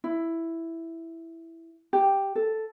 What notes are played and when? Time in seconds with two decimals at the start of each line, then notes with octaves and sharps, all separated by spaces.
0.04 E4
1.93 G4
2.35 A4